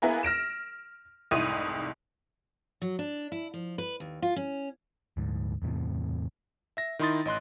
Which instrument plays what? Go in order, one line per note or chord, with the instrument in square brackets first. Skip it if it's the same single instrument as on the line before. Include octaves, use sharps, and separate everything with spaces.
[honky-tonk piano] A#3 B3 E4 G#4 A#4
F6 A#6 D7 E7
F1 C2 G#2 E4 D#6 D#7
[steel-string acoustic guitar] F#3
D4
E4
F3
B4
D#2
F4
C#4
[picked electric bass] D2 G#2
E2 A2 C3
[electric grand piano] E5 A#6
D#3 D#4 E4 C6 D#6 A6
A1 D#5 C6 F#6